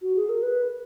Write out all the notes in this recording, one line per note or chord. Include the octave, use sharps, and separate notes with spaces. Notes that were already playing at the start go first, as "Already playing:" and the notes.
F#4
G#4
A#4
B4